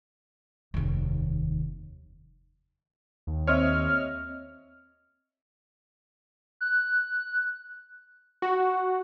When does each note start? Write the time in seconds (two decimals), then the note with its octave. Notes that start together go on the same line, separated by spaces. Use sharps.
0.74 F1 D#2
3.27 D#2
3.47 C4 C5 C#5 D#5 E5 F6
6.61 F#6
8.42 F#4